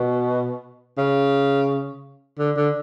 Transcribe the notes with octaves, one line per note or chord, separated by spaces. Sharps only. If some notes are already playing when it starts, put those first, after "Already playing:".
Already playing: B2
C#3
D3
D3